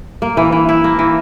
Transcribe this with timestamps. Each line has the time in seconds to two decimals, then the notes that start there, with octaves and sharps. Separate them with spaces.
0.22 A#3
0.37 E3
0.52 E3
0.69 E4
0.84 A#3
0.99 E3